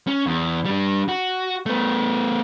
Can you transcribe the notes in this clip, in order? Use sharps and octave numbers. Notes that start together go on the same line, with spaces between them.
C#4
E2
G3 D4
F#4
A3 B3